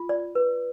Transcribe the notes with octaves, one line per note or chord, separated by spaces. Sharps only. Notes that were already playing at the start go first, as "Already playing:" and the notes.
Already playing: F4
D5
B4